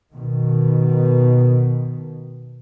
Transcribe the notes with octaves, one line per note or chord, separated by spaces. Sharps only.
B2 D#3